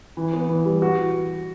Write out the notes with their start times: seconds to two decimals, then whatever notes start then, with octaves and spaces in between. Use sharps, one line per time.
0.17 E3
0.33 B3
0.49 E3
0.66 G3
0.82 F#4